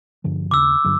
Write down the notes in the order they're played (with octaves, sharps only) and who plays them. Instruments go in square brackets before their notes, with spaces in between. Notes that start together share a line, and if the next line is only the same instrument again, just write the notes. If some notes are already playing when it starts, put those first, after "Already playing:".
[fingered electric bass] G2 D3 F3
[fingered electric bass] D#2 C#3 [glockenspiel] D6 E6
[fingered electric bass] G2 D3 F#3